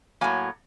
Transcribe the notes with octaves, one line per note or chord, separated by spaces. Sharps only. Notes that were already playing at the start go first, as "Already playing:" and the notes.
A2 F#3 A#3 G#5